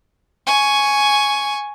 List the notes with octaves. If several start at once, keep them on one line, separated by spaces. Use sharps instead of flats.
G#5 C#6